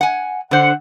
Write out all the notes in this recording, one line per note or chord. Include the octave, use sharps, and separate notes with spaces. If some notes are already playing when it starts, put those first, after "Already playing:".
F#5 G#5
D3 C5 F#5